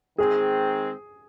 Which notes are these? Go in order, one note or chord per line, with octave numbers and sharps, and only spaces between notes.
D#3 G#3 C4 G#4